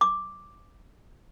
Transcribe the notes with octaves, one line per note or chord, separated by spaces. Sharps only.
D6